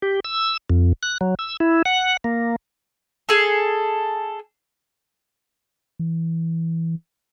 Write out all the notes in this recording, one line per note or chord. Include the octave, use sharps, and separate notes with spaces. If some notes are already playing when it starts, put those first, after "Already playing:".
G4
E6
F2
F#6
F#3
E6
E4
F#5
A#3
G#4 A4
E3